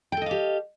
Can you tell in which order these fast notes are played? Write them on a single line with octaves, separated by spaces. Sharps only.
G5 A4 D#5 F5 G4